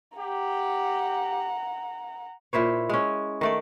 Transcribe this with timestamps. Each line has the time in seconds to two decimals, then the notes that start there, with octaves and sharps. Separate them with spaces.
0.18 G4 F#5 A#5
2.53 A#2 E4 C5 C#5
2.89 G#3 C#4
3.41 D#3 A3 D5